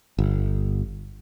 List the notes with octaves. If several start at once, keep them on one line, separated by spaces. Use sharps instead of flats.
G1